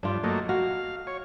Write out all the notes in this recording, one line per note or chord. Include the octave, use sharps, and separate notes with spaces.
G2 D4 F4
F#3 A3 A#3 D#5
F#4 F5
C#5